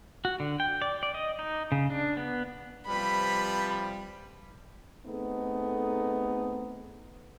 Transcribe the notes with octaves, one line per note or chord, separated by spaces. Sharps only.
F#4
D3
G5
D5
D5
D#5
D#4
C#3
D4
B3
C3 F3 G3 B4 B5
A3 B3 C4 D#4 G#4 A4